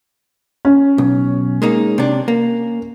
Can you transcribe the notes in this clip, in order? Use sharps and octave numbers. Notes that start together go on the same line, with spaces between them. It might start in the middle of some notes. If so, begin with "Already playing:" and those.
C#4
B1
G#3 A#3 D#4
C3 D4
A#3